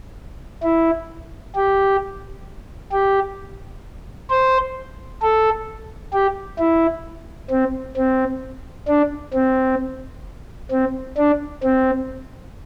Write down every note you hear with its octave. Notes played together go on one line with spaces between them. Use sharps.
E4
G4
G4
C5
A4
G4
E4
C4
C4
D4
C4
C4
D4
C4